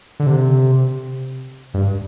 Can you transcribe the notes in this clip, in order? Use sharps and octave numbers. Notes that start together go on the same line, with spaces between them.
D3
C3
G2